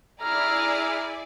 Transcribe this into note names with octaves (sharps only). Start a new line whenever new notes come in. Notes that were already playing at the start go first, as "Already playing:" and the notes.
E4 G#4 D5 A#5 F6